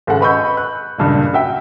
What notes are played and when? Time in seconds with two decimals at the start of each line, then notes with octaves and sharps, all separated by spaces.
0.07 G#1 C#3 G#4 A4 F#5
0.21 B4 D#5 B5 C#6 E6 G6
0.57 F#6
0.98 C#2 G2 A#2
1.33 F#4 E5 G5